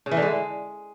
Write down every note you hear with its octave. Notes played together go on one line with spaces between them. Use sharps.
C#3
E3
D3
G#3